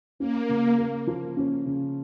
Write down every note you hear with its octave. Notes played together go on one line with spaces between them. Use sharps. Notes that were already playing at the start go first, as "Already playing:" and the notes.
A#3 C#4
C#3
A#3
F3
C#4
C#3